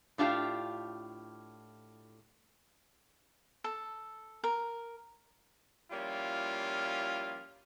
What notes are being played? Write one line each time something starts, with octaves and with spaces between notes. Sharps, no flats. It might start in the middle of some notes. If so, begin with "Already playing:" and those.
A2 D4 F4 G4 F5
A4
A#4
F3 G3 A#3 C#4 E4 F4